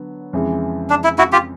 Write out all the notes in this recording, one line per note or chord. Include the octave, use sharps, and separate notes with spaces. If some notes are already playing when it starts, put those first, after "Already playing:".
Already playing: D3 F#3 B3
F2 C#3 E3 G#3
D4
E4
E4 F#4
F4 G4